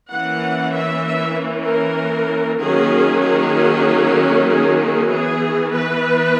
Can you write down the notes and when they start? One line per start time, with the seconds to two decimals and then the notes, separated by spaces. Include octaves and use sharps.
0.12 E3 A#3 C#4 F#5
0.75 E5
1.06 E5
1.68 A#4
2.61 D#3 F#3 A#3 C#4 G#4
3.23 G#4
4.48 G#4
4.79 G#4
5.11 E3 B3 G#4
5.73 B4